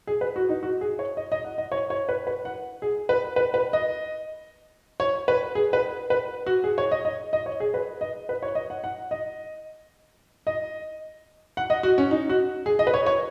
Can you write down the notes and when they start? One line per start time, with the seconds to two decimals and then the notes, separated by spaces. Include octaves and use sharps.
0.07 G#4
0.21 B4
0.36 F#4
0.49 D#4
0.63 F#4
0.81 G#4
0.99 C#5
1.17 D#5
1.32 D#5
1.44 F#5
1.58 D#5
1.72 C#5
1.90 C#5
2.09 B4
2.27 B4
2.45 F#5
2.82 G#4
3.09 B4
3.36 B4
3.54 B4
3.73 D#5
5.00 C#5
5.28 B4
5.55 G#4
5.73 B4
6.10 B4
6.46 F#4
6.64 G#4
6.78 C#5
6.91 D#5
7.05 D#5
7.33 D#5
7.46 C#5
7.60 G#4
7.74 B4
8.01 D#5
8.29 B4
8.42 C#5
8.55 D#5
8.70 F#5
8.84 F#5
9.11 D#5
10.47 D#5
11.57 F#5
11.70 D#5
11.83 F#4
11.98 C#4
12.11 D#4
12.29 F#4
12.66 G#4
12.79 D#5
12.87 B4
12.94 C#5
13.06 C#5